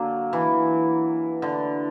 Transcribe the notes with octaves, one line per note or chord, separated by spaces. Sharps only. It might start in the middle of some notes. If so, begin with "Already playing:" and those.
Already playing: D3 F#3 A#3
E3
D3